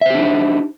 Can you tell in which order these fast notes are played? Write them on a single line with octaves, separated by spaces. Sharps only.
E5 C5 G4 D4 D#4